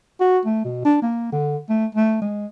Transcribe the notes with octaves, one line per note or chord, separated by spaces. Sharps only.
F#4
A3
B2
D4
A#3
D3
A3
A3
G#3